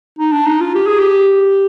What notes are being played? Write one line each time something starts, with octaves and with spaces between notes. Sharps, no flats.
D#4
D4
D#4
F4
G4
G#4
G4